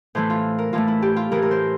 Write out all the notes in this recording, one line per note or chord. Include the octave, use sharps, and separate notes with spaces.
A2 E3 A3 C5
F4
A#4
A2 E3 A3 F4
E4
G4
F4
A2 E3 A3 A#4
A#4
C5